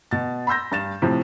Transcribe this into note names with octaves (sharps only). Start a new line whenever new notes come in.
B2 A6
B5 C6 E6 G6 A#6
G2 A6 E7
A2 C3 F3